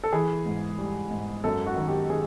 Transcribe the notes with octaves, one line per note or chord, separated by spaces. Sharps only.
A4
E3 G#4
G#2
G3
G#2
F#2 A4
F#4
D#3
G4
D#3 G#4